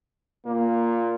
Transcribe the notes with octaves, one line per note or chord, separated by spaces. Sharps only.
A#2 A#3